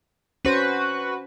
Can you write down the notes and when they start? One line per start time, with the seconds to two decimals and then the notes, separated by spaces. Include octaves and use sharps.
0.45 C#4 F#4 B4 C5